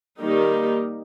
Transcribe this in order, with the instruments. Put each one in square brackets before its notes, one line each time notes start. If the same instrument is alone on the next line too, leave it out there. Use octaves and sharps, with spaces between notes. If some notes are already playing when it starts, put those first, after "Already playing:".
[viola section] D#3 G3 A#3 D#4 G4